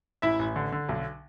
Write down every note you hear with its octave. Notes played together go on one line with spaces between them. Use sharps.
A1 E4 E5
A1
D3
D3
B1